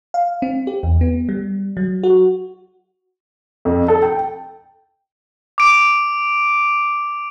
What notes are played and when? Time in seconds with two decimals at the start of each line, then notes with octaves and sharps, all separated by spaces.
0.14 F5
0.42 C4
0.67 G4
0.83 E2
1.01 B3
1.29 G3
1.77 F#3
2.03 F#4
3.65 F2
3.88 A4
4.02 G5
5.58 D6 D7